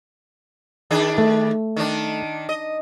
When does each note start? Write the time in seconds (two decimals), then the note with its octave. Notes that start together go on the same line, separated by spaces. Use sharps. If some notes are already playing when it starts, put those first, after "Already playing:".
0.91 D#3 D4 G#4
1.18 A3
1.76 D#3 D4
2.49 D#5